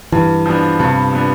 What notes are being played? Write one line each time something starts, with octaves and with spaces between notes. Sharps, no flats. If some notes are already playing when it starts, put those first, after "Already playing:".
G2 E3
F3 B3 D4
G2 C3
F3 B3 D4